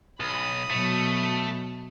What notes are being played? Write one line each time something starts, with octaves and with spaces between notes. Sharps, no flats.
B1 B5 D#6
B2 F#3 A3